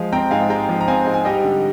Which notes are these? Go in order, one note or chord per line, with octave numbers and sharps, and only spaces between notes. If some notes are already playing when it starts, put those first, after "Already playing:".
Already playing: F3 G#3 F5
C4 G5 A#5
G#2 F5 G#5
G#3 G5 A#5
F3
A#5
C4 F5 G#5
G#2
G#5
G3 D#5 G5
D3